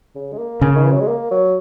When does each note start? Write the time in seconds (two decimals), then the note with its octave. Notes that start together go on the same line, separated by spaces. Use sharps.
0.15 C#3
0.33 G#3
0.39 A#3
0.61 C#3 A#3
0.76 D#3
0.84 E3
0.92 F#3
1.00 G#3
1.08 A#3
1.31 F#3